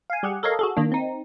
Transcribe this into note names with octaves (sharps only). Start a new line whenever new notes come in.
F5 G#5
G3 G4 G#4 F#5
A4 A#4 C#5 D#5 F5
F#4 G#4 A4
D#3 A#3 D4
C4 D#4